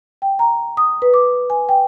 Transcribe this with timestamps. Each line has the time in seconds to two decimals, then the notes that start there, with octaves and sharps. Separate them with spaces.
0.22 G5
0.39 A#5
0.77 D#6
1.02 B4
1.14 D6
1.50 G#5
1.69 G5